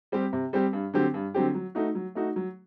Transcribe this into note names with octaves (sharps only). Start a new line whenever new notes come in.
G3 C4 G4
C3
G3 C4 G4
G2
D3 F#3 C4 G4
G2
D3 F#3 C4 G4
F#3
A3 D#4 F#4
F#3
A3 D#4 F#4
F#3